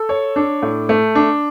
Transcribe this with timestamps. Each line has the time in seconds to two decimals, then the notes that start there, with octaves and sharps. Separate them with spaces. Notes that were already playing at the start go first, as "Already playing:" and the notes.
Already playing: A4
0.09 C#5
0.36 D4
0.62 A2
0.89 A3
1.15 D4